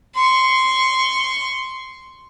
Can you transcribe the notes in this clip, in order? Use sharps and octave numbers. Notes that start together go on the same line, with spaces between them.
C6 C#6